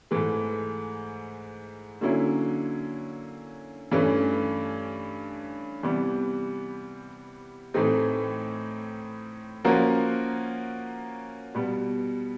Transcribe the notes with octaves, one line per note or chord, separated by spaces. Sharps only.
G#2 E3 A3
D3 F#3 A#3 C#4 E4
G2 E3 A3 C#4
C3 E3 G3 B3
A2 E3 A3 C4 D#4
F3 A#3 C#4 F#4 A#4
B2 G3 B3